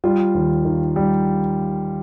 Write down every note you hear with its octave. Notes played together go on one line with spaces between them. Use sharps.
G3 F4
D#2
D#3
G3